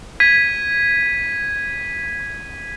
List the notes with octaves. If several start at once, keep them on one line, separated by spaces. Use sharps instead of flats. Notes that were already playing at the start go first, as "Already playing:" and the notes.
G#6 B6 D#7